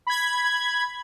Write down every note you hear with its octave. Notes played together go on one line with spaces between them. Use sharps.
B5 G#6